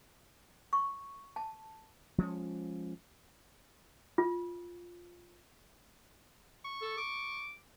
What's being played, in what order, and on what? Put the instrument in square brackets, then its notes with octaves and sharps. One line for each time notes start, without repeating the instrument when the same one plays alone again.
[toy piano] C#6
A5
[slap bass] F3 G#3 C4 C#4
[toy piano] F4
[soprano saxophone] C#6
[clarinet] A4
D6